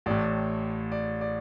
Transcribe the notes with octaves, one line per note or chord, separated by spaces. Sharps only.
A1 A2 D5
D5
D5